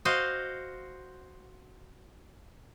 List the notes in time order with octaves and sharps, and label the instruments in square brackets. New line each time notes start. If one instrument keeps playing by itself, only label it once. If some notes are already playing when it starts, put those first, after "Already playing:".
[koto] F#4 C5 D#5 F5